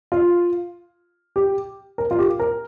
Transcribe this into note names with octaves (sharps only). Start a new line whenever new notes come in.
F4
G4
A#4
F4
G4
A#4